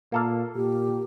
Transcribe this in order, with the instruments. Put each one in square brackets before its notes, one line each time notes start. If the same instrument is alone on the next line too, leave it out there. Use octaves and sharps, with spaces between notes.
[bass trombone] A#2 [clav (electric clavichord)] A#3 A4 F5
[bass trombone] A#2 [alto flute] G4